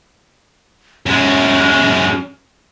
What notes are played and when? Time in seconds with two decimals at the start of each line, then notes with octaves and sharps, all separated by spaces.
1.06 F#2 G#3 C#4